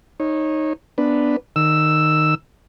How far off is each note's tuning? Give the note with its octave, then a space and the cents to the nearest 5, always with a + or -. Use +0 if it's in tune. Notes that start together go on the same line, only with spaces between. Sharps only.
D#4 +0 C#5 -20
B3 +0 D4 +0 B4 +0
D#3 -15 E6 +0